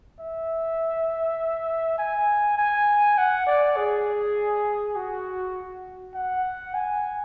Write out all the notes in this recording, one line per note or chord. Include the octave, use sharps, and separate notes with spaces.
E5
G#5
G#5
F#5
D5
G#4
F#4
F#5
G#5